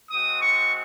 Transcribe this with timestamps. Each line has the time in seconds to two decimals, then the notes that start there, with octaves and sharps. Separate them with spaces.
0.11 G#3 C4 F#4 D#6
0.41 C#6